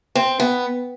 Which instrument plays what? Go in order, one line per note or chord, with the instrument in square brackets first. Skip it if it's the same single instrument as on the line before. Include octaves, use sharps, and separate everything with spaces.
[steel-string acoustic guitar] C4
B3